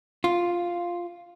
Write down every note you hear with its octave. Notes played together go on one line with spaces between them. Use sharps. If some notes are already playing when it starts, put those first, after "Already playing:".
F4